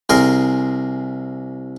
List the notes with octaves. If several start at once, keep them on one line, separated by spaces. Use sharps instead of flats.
C2 G#4 A#4 C6